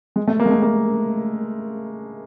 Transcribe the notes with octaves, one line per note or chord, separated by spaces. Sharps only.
G#3
A3
A#3
G#3
A3
A#3